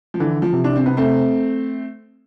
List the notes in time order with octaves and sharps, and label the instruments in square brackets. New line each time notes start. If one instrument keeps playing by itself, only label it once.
[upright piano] F3
[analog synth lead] D3 [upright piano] E3
[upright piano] F3
[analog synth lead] C3
[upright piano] D4
C4
B3
A3 C4